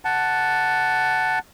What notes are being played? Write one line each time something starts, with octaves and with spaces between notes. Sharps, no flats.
F#5 A5